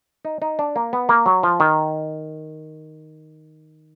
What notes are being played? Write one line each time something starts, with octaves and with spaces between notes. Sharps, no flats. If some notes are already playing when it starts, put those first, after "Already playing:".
D#4
D#4
D4
A#3
B3
A#3
F#3
F3
D#3